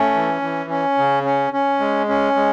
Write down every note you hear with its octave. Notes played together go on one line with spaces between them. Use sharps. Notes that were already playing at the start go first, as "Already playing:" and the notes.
Already playing: A3 C#4
E3
E3
C#4
C#3
C#4
C#4
G#3
C#4
G#3